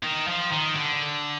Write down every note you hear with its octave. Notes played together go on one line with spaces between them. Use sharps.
D#3
F3
D#3
D3